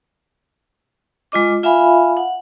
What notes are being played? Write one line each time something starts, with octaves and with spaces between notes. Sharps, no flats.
G#3 F4 D#5 D6
F4 E5 F5 G#5 B5
F#5